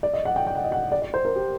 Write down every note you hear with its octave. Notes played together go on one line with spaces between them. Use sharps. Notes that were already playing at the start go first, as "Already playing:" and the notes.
D5
D#5
F#5
G5
G5
F#5
D#5
F#5
D5
D5
C5
A#4
G4